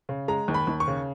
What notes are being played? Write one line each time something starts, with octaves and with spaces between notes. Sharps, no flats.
C#3
G#3 A#5
D#2
B5
D#2
C#6
C#3